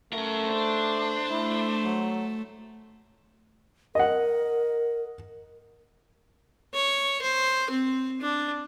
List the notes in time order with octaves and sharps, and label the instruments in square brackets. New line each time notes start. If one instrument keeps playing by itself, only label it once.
[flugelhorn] A3 [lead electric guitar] C#4 A#4
[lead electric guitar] D4 [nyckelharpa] C5
[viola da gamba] A3 [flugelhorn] E4
[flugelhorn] F#3
[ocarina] A#4 [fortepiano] D#5 F#5
[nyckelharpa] C#5
C5
C4
D4